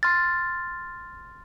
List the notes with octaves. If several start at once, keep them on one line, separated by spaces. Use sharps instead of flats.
C6 F6 A6